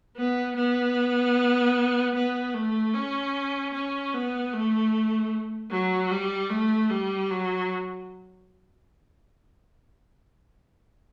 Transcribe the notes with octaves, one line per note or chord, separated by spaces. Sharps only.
B3
B3
B3
A3
C#4
C#4
B3
A3
F#3
G3
A3
G3
F#3